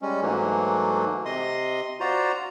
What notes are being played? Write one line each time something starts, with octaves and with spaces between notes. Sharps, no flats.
G3 G#3 C#4
G#2 E3 F#3 A3 A#3
C3 D#5 C6 D#6
F4 F#4 C5 D5 A#5